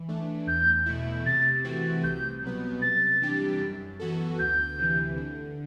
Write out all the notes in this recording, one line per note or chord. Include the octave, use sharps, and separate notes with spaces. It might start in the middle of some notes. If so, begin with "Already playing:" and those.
Already playing: E3
A3 D4
E2 G6
B2 A3 E4
C3 A6
E3 A3 C4 F#4
C2 G6
B2 F#3 B3
C3 A6
E3 G3 D4 G4
F#2
E3 B3 F#4 A4
D2 G6
C3 E3
D3